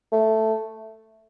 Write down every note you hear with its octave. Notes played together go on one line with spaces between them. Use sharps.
A3